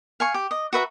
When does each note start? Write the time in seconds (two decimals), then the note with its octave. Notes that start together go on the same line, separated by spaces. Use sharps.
0.20 F5 G#5 C#6
0.34 G4
0.51 D#5
0.73 F#4 B4 E5 A#5